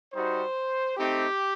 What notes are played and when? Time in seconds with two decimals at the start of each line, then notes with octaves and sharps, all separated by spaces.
0.14 G3 D#4 F#4 C5
0.97 A3 C4 D#4 G4